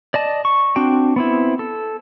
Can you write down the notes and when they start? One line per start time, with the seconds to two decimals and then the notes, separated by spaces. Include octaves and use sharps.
0.14 D5 D#5 A5
0.45 C#6
0.76 C4 D4 F#4 G5
1.16 B3 C4 E4
1.59 A4